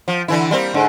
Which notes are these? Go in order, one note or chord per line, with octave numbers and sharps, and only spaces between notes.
F3
D3 E3 E4
G3 A#3 C4
G#2 D3